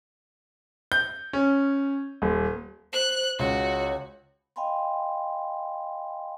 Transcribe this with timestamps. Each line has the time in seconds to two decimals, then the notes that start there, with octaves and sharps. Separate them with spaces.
0.92 G6
1.33 C#4
2.22 D#1
2.93 C5 F#6
3.39 C#2 F#4 C#5
4.56 D#5 F5 G5 G#5 B5 C6